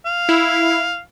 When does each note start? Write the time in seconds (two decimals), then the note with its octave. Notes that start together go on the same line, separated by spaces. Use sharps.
0.06 F5
0.29 E4